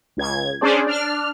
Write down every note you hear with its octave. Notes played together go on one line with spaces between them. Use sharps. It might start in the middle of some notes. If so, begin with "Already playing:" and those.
C#2 G#6
C#4 D4 G#4 C5 D5
D4 F6